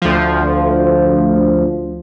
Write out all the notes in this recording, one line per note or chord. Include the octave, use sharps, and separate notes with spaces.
D2 F3